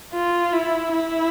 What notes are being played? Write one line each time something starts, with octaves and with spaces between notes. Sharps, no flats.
F4
E4
E4